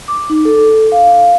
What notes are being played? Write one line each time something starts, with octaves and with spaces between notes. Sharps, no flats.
D6
D#4
A4
F5